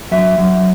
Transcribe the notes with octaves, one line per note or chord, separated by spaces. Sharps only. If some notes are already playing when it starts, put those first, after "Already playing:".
F#3 E5
F#3